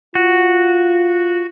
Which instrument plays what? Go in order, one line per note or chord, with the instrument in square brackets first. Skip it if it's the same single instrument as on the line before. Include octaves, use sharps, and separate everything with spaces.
[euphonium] F4 [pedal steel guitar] F#4